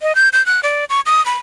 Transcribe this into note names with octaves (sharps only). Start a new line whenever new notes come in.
D#5
G6
G6
F#6
D5
C#6
D#6
B5